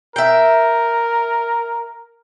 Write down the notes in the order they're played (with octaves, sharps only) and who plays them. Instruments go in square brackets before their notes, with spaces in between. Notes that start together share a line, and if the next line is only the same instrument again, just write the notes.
[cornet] A#4 [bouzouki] E5 G5